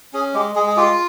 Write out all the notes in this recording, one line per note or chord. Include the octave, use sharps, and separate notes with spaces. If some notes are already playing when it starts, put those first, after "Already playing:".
C#4 G#4
G#3 G4
G#3 G#4
G#4
F4 G4